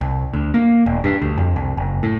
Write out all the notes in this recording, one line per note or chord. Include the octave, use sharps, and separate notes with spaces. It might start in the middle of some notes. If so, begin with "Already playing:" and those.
C2
D2
A#3
E1
G2
D2
F2
C2
F#1
A2